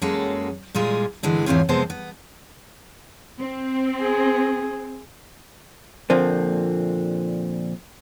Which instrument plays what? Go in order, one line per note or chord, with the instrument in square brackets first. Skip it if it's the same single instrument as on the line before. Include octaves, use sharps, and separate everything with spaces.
[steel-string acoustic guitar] F#2 F#3 G#3 A#3 G#4 A4
A#2 G3 G#3 F4 G#4
G2 D3 E3 G#3
E2 G#2 A3 C4 F4 C#5
F2 C3 G#3 B3 C5 A5
B3
[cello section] C4
[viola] G#4
[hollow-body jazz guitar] A#2 D3 F3 A#3 C4